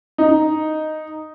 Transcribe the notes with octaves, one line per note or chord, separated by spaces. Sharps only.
D#4